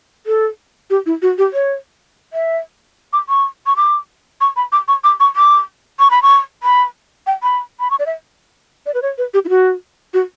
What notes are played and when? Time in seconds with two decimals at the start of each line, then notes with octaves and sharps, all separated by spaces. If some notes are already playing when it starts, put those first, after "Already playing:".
0.26 A4
0.90 G4
1.06 E4
1.22 F#4
1.38 G4
1.53 C#5
2.33 E5
3.13 D6
3.29 C#6
3.66 C#6
3.77 D6
4.41 C#6
4.56 B5
4.72 D6
4.88 C#6
5.04 D6
5.20 C#6
5.36 D6
5.99 C#6
6.11 B5
6.23 C#6
6.63 B5
7.27 G5
7.43 B5
7.80 B5
7.91 C#6
7.99 D5
8.06 E5
8.86 D5
8.94 B4
9.02 C#5
9.18 B4
9.34 G4
9.45 E4
9.49 F#4
10.14 F#4